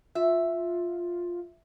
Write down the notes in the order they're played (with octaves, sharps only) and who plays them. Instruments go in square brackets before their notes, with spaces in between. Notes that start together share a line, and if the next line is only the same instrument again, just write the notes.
[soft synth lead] F4 [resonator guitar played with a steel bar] E5